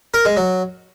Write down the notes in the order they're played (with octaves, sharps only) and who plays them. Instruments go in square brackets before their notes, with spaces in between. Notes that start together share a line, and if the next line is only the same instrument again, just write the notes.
[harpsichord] A#4
G#3
F#3